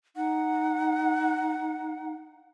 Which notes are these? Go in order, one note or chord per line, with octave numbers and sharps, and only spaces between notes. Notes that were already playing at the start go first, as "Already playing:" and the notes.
D#4 F#5